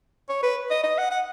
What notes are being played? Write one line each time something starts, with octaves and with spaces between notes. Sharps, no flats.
C#5
B4
D#5
D#5
F#5
F#5